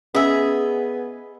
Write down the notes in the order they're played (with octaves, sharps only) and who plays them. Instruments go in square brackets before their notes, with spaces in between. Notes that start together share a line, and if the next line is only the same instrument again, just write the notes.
[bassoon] B3 [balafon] C#4 [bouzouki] G#4 [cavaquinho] D#5 E5